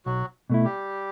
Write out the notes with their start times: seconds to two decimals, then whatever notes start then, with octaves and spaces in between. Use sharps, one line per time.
0.05 B1 F#3 F#4
0.50 B2 A3 E4
0.64 G3 G4